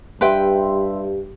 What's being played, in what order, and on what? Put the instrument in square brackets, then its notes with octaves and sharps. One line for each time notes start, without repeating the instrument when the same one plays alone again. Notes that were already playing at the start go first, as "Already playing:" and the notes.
[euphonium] G2 [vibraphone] G4 [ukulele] B4 G5 [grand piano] E5 C6